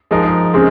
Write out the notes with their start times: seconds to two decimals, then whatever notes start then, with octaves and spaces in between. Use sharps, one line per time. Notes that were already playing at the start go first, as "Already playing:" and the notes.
0.11 F3 G#3 D#4 A#4
0.54 C#3 G#3 C4